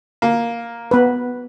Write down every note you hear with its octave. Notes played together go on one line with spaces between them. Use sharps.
A#3
B3 B4